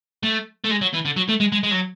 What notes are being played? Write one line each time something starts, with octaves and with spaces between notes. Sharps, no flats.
A3
A3
G#3
F#3
E3
D3
F#3
A3
G#3
G#3
G#3
F#3